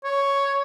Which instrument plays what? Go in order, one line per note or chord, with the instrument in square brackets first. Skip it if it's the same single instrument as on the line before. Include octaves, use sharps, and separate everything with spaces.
[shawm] C#5